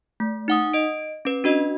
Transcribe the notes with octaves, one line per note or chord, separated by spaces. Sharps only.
A3
D#4 F#5 D#6
D#5 D7
C#4 B4
D4 F#4 D#5